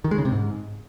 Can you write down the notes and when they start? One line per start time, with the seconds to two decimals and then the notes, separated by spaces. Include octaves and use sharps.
0.04 D#3
0.11 G#3
0.18 C#3
0.25 C3
0.32 G#2